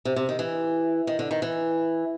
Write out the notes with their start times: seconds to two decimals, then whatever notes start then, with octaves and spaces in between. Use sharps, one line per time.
0.05 C3
0.16 C3
0.29 D#3
0.39 E3
1.07 D#3
1.19 D3
1.31 D#3
1.42 E3